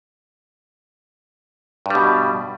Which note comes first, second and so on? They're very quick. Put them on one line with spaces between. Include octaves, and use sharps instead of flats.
G2 G3 B2